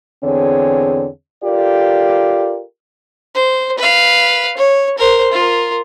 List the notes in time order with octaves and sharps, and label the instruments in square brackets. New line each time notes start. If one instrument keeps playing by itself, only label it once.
[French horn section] E2 D3 C4 G#4 C#5
F4 G4 A4 A#4 D5
[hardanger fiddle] C5
B4 F5
C#5
A#4 C5
F4 A#4